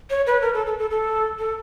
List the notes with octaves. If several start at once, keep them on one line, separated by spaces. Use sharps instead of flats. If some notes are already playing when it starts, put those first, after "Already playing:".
C#5
B4
A#4
A4
A4
A4
A4
A4